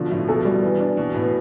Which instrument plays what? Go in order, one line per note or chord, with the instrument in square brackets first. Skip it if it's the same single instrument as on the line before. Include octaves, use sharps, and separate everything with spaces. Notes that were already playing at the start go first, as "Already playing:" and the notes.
Already playing: [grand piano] B2 [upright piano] D3 F3
[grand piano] A2 [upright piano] F3
[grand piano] B2 [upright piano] A4
[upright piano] G3
E3
D4
[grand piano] B2 [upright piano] E3
[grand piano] A2 [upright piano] B3